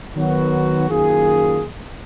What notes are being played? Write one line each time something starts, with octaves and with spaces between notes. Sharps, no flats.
D#3 F#3 B3 F#4
F#2 D#3 A#3 F4 G#4